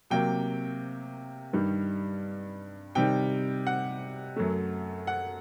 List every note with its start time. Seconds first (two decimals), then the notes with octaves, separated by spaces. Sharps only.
0.10 C3 F#3 A#3 G5
1.53 G2 D#3 G3
2.95 C3 D#3 G3 G5
3.67 F#5
4.36 F#2 F#3 A3
5.07 F#5